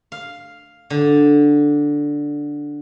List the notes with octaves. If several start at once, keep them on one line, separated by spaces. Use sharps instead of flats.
F5
D3